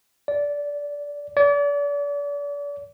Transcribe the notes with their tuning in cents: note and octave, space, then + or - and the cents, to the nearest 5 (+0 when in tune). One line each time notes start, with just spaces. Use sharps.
D5 -15
D5 -35